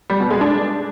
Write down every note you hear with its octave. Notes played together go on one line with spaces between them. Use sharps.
G3
B2
G#3
D4